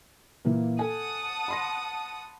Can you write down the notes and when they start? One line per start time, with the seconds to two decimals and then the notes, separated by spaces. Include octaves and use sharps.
0.45 A#2 E3 A#3
0.79 A4 F#5 G#5 A5 D#6
1.48 B5 C6 A#6